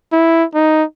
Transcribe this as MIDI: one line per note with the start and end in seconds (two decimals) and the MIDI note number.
0.12 0.44 64
0.55 0.84 63